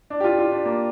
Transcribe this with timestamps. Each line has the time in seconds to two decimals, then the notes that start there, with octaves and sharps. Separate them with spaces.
0.10 D4
0.20 G4
0.24 F4
0.39 F4
0.52 D4
0.65 A#3